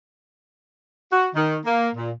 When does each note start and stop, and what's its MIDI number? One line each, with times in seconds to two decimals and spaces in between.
1.11 1.26 66
1.35 1.57 51
1.65 1.89 58
1.95 2.11 46